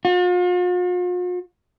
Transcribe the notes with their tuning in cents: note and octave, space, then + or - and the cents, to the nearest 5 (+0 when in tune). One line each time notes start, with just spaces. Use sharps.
F4 +45